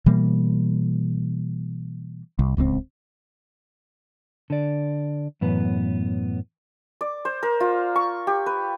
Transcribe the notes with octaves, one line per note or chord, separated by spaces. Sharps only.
B2 E3 G3 A#3
C2
D1 C#2 B2 C4
D3 D5
F#2 A2 E3 B3 B4
D5
C5
A#4
F4
C#6
G4
B4